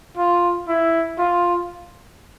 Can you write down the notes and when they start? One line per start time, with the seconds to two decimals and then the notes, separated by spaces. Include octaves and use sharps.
0.17 F4
0.68 E4
1.19 F4